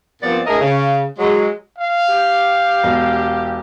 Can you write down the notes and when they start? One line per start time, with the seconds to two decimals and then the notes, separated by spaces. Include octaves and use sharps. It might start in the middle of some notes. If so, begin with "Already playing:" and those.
0.21 G2 A#2 F3 B3 C4 D5
0.46 A2 D4 E4 G#4 A#4 D#5
0.60 C#3
1.18 F#3 G#3
1.78 F5
2.09 G4
2.83 E1